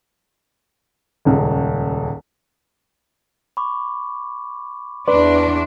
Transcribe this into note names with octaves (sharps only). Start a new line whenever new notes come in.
D#1 C#2
B5 C#6 D6
E2 D4 B4 D5 C6